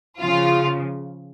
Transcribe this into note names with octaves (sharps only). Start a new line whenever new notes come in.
C#3 F3 F4